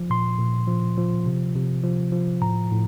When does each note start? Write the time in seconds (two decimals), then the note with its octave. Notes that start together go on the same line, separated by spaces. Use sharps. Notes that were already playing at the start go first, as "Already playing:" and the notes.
Already playing: F3
0.10 A#2 C6
0.39 A#2
0.68 F3
0.98 F3
1.26 C3
1.55 C3
1.83 F3
2.12 F3
2.42 A2 A#5
2.71 A2